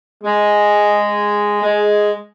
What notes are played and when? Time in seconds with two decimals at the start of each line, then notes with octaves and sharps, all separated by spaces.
0.24 G#3
1.62 G#3